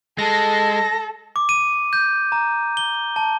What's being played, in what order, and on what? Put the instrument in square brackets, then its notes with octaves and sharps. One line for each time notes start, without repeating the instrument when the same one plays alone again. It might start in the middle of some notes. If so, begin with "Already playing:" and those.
[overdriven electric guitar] G#3 [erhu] A4 [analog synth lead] A#6
[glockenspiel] D6
D#7
G6
A#5
G7
A5